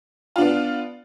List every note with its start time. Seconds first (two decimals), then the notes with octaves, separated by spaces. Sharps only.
0.36 F4
0.38 D4
0.41 B3